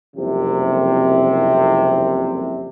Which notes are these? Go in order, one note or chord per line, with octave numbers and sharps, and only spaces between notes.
F#1 C2 F2 C3